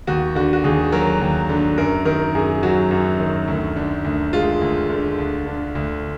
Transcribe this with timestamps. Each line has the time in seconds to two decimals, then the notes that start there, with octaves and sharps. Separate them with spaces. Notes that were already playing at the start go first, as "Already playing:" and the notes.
0.07 D#2 F#4
0.35 D3 F#4
0.53 F#4
0.64 D#2 G#4
0.92 F#3 A#4
1.21 D#2
1.49 D3
1.77 F#2 A#4
2.05 D#3 A#4
2.35 F#2 G#4
2.63 F#3 F#4
2.91 F#2
3.20 D#3
3.48 D2
3.76 D3
4.05 D2
4.33 G#3 F4
4.61 D2
4.90 D3
5.19 D2
5.46 D3
5.75 D2